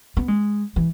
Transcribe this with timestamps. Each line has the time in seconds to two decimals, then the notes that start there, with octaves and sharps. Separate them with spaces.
0.17 B3
0.28 G#3
0.76 E3